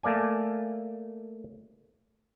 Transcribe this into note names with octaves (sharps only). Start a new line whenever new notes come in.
A3 A#3 D5 G#5